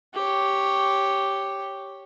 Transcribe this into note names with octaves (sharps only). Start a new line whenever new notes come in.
G4 C#5